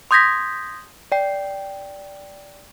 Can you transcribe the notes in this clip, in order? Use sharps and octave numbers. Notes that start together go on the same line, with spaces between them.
C6 D#6 G6 G#6 A#6 B6
D5 G5